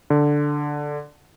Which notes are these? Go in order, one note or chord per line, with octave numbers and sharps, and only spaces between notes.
D3